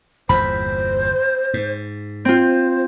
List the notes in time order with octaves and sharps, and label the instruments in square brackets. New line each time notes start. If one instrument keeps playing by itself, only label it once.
[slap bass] G1 E2 A#2 [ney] C5 [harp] B5
[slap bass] G#2
[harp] C4 F4 [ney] C5